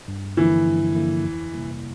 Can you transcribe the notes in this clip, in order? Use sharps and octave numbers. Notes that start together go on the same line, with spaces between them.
G2
D3 E3 F3 A#3 E4
G2
D3 F3 A#3 E4
F2
C3 G3 A#3 E4